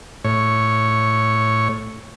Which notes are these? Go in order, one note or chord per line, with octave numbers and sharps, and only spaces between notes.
A2 C#5